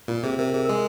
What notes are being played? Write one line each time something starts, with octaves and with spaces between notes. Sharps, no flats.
A#2 F4
C3 G#4
C3 A#4
C3 G#4
A#4
G#3 G#4